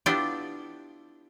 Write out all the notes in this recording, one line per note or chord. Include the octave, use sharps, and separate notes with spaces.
B3 D4 E4 F4 G4